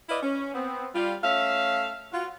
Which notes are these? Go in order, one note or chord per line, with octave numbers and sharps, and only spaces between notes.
E4 B4 D5 D#5 F5
C#4
B3 C4
G3 F4
A3 C#4 E5 F5
F4 F#4